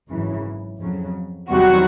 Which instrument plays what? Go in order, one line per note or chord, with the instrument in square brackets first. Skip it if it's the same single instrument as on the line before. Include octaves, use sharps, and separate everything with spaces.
[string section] G#1 F#2 C#3 E3
F2 C#3 F#3
E2 C3 D#3 F#3 G3 F#4